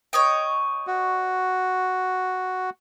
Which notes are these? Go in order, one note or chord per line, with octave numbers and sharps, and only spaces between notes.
C#5 D#5 G5
F#4